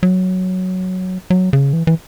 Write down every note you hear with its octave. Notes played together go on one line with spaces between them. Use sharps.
F#3
F#3
C#3
E3
E3